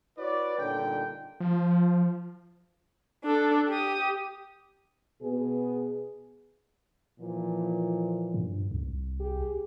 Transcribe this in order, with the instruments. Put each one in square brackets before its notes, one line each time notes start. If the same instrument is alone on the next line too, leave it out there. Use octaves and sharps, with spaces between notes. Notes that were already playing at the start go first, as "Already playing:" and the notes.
[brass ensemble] E4 F#4 B4 C#5 D5
G1 G2 A#2 D3 D#4 G5
[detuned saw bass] F3
[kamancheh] D4 A4
G4 D#6
[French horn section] B2 B3 G#4
A#2 E3 F3
[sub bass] G2
C2
[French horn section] G4 G#4